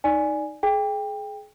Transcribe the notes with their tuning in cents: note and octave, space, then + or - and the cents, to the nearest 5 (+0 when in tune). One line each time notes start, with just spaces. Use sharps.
D#4 +0 D5 +0 G#5 +0
G#4 +30 G5 +20